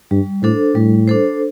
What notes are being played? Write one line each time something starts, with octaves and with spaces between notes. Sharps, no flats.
G2 G3
A2 D4 A4 C5
A2 G3
D4 A4 C5